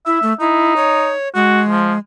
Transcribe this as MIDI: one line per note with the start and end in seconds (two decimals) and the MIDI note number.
0.06 0.19 64
0.06 0.33 76
0.23 0.33 57
0.40 1.13 63
0.40 0.74 64
0.76 1.29 73
1.35 1.99 56
1.35 1.62 66
1.69 1.93 53